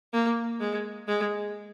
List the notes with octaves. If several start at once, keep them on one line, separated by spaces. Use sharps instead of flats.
A#3
G#3
G#3